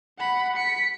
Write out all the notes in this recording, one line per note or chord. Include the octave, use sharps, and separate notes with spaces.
F#5 B5
B6 C#7